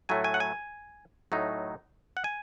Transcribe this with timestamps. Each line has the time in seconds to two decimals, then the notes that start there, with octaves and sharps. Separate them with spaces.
0.09 A2 F#3 A3 G#5
0.24 G#5
0.34 F#5
0.40 G#5
1.32 A2 F#3 A3 D#4
2.17 F#5
2.24 G#5